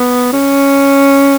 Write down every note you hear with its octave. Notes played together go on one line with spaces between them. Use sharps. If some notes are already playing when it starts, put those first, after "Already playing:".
Already playing: B3
C#4